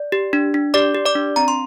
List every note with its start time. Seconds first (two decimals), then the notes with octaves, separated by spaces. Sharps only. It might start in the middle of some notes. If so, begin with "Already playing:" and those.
Already playing: D5
0.12 G4
0.33 D4
0.54 D4
0.74 G4 D5 D6
0.95 G4
1.06 D5 D6
1.15 D4
1.36 C4 A#5
1.48 C6